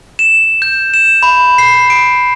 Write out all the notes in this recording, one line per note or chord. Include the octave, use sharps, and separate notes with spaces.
E7
G6
E7
B5
C7
D7